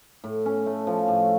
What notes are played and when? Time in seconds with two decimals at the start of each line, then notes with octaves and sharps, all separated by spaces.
0.24 A2
0.46 C#4
0.66 A3
0.87 F3
1.08 A2